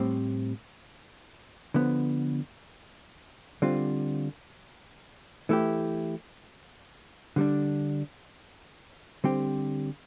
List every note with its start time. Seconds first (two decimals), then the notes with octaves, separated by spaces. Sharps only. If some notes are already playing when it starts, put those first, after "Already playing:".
Already playing: A2 G3 C4
1.74 D3 F3 B3
3.62 D3 G3 C4 F4
5.49 E3 A3 E4 G4
7.36 D3 G3 D4
9.24 D3 G3 C4 G4